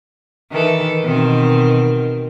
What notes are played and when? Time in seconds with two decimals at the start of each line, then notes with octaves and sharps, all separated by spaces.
0.51 D#3 E3 A4
1.04 B2 D#3 C4